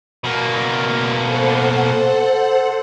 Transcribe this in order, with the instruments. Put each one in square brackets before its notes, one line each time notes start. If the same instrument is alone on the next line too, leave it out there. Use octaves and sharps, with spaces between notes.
[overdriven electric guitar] B2 A#3
[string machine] A4 C5 F#5